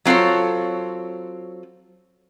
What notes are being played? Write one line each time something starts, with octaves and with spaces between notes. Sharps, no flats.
F#3 C4 F4 A4 C#5